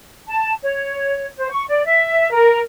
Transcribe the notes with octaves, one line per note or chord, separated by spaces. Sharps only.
A5
C#5
C5
C#6
D5
E5
A#4